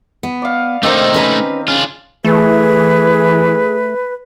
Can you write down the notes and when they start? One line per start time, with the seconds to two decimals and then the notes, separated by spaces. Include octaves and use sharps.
0.23 B3
0.42 D5 F5
0.83 D#3 A3 C4 D4 D#4 G4 C5
1.14 C#4 B4 A#5
1.68 C#3 D4 F4
2.25 E3 A3 G#4 B4